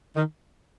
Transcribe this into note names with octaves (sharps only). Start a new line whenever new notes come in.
D#3